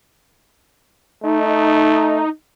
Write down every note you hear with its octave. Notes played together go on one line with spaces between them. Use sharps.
A3 D#4